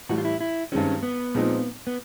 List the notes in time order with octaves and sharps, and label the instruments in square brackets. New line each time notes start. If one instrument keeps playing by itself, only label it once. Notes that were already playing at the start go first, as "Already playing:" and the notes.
[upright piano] A2 E3 G3 [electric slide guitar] F#4
[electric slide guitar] F4
E4
E4
[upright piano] G2 D#3 G#3 C4 [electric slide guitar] C#4
[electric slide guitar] B3
[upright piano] A#2 F3 G#3 C4 D#4
[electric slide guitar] B3